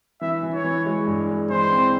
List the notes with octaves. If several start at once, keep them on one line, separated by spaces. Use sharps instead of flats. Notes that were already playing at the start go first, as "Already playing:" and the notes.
E3 E5
E3
C#5
E3
G#3
G2
G#3
E3 C5
C4